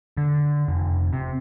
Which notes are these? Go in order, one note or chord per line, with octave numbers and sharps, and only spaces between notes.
D3
F1
C3